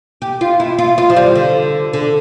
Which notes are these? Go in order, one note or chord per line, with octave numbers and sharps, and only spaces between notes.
G4
F4
E4
F4
F4
F3
G3
D3
D3